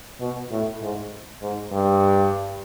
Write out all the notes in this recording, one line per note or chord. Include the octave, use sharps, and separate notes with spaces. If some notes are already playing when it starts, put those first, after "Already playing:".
B2
A2
G#2
G#2
G2